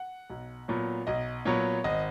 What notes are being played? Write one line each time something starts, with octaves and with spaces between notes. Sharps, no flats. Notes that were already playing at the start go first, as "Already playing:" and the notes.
Already playing: F#5
B1
A#2 F#3 B3
B1 D#5
A#2 F#3 B3 C#5
G#1 D#5